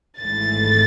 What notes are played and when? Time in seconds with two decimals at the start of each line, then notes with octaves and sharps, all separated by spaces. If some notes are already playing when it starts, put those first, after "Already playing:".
0.21 G#1 G#2 E3 A3 A6